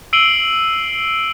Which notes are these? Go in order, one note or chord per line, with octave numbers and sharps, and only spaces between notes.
E6 C7 D7 D#7 F#7 G7